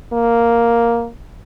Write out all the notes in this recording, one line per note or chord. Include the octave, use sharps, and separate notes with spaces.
A#3